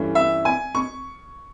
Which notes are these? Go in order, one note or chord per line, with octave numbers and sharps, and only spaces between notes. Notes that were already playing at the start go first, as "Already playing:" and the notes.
Already playing: G2 E3 A3 C#4
E5
G#5
C#6